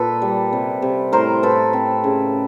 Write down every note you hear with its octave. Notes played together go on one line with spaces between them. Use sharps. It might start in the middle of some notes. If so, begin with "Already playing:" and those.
Already playing: A#2 A4 B4
G3
C3
C3
A2 A#4 C5
A2 A4 B4
C4
C#3